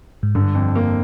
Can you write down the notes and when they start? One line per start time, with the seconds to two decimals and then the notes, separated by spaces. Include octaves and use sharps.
0.23 G#2
0.35 G2 D3
0.55 F2
0.75 A#3